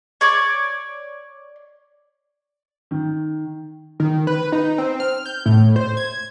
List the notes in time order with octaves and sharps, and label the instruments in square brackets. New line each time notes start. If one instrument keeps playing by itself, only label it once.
[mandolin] C#5 D5
[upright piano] D#3
[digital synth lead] D#3
B4
D#4
C4
F6
G6
A2
C5
G#6